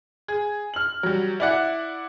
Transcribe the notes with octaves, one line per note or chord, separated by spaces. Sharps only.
G#4
F6 F#7
F#3 G3
E4 D5 F#5